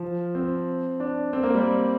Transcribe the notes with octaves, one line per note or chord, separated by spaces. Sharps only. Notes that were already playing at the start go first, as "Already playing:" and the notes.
Already playing: F3
C4
D4
C4
A#3
G3